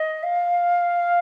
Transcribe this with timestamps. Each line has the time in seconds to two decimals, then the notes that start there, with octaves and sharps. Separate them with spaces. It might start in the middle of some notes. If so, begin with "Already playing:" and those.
Already playing: D#5
0.23 F5